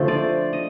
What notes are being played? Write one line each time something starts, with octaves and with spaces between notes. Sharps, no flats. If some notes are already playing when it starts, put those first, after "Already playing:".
Already playing: D3 F3 A3 C5
D5
D#5